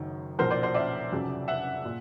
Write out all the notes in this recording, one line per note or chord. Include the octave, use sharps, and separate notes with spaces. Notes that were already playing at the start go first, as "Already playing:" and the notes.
Already playing: F#1 F#2 D#3 F#3
B1 A#2 F3 A#4 C5
C5 D5
C5 D5
D5 E5
F1 F2 C#3 F#3
E5 F#5
A#2